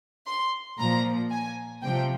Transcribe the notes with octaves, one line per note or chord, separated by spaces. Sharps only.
C6
A#2 F3 A#5
G#5
C3 F3 G5